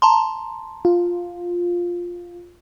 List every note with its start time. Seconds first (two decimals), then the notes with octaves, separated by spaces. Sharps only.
0.02 A5 A#5 C6
0.85 F4